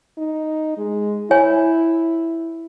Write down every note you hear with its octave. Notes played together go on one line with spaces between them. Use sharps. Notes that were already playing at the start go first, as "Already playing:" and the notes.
D#4
G#3
E4 C#5 G#5